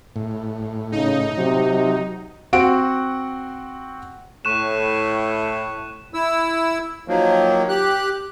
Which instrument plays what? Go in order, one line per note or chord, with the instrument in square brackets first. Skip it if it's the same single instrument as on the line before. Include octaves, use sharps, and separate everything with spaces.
[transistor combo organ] A2
[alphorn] C#3 [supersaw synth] D#4
[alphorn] C3 [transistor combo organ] F#3
[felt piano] C4 F#4 F#5 D7
[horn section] A2 [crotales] C#6 F#6 E7
[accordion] E4 E6
D#3 F3 F#3 A#3
G4 F#6